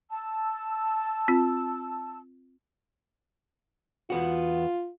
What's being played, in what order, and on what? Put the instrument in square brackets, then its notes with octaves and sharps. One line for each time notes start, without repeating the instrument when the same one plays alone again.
[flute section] A5 E6
[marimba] C4 F4
[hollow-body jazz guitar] E2 B3 F#4 [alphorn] F4